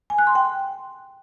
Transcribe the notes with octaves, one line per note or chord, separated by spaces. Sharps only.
G#5
F#6
C6
G5